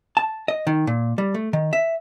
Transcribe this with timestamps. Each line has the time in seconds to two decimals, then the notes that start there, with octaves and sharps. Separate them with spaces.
0.17 A5
0.48 D#5
0.67 D#3
0.87 A#2
1.18 G3
1.34 A3
1.53 D#3
1.73 E5